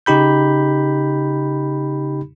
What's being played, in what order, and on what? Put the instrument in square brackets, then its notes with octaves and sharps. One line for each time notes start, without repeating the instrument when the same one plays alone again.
[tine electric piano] C#3 D#4 G4 B5 G6